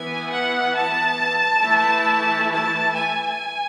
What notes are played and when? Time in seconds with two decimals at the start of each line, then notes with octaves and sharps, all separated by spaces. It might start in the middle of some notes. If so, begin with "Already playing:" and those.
Already playing: E3 B3 E4 G#5
0.31 F#5
0.75 A5
1.63 E3 A3 E4
2.52 A5
2.96 G#5